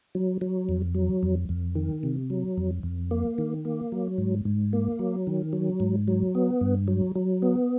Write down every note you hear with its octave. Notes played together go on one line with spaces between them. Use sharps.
F#3
F#3
F2
F#3
F2
F2
D#3
C3
F#3
F2
F2
A#3
D#3
A#3
F#3
G#2
G#2
A#3
F#3
D#3
F#3
G#2
F#3
B3
G2
F#3
F#3
B3